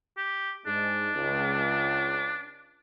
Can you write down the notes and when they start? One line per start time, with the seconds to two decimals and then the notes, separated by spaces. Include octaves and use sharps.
0.17 G4
0.66 G#2 G#3 D4
1.15 C#2